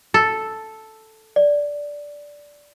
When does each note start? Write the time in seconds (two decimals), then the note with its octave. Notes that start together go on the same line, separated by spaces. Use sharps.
0.14 A4
1.36 D5